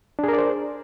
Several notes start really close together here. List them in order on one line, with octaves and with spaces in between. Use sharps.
D4 G#4 A#4 D5 C5